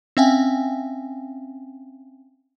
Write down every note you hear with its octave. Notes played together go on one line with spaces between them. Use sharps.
C4 C#4 E5 F5 G5 G#5